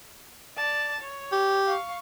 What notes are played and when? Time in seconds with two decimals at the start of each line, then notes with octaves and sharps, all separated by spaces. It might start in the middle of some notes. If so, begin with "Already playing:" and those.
0.56 D5 A5
1.00 C#5
1.32 G4
1.67 F5 C#6